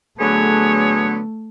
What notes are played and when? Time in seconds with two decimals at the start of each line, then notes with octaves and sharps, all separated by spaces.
0.20 D3 F#3 A3 B3 G#4 C#5